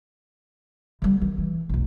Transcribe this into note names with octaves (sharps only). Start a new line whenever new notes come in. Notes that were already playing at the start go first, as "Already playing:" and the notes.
D3 G3
D#3
E3
F1 B1